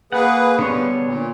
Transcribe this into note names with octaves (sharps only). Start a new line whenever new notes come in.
A#3 G#4 B4 F#5
D3 G3 B3 C#5
A#2